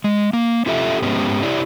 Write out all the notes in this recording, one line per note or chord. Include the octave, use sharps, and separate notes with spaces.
G#3
A#3
C#4 F4 G4 A4 E5
G#2 G#3 B3 C#4 G4
E4 G4 C#5 D5